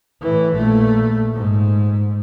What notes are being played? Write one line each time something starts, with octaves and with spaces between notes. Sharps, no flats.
A2 E3
A#1 A3
G#2